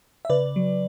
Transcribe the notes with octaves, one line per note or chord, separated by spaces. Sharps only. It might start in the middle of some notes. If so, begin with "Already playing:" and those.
E5
C#3 B4 D5
F#3